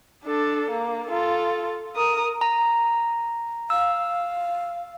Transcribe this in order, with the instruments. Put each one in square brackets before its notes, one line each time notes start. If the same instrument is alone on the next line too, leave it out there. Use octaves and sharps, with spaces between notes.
[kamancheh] D4 A4
A#3
F4 A4
A#4 D#6
[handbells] A#5
[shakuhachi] F5 [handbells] E6